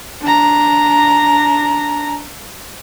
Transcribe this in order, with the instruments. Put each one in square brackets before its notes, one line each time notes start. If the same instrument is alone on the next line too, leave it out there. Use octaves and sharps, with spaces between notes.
[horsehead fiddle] D4 A#5